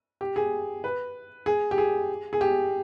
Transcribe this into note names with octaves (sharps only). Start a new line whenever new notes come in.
G4
G#4
B4
G#4
G4
G#4
G#4
G4